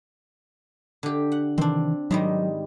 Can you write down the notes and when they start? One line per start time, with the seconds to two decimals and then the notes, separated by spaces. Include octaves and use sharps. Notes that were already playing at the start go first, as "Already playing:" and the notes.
1.03 D3 G4
1.32 F#5
1.58 C3 D#3 E3 C4 D4
2.11 G#2 D#3 F#3 G3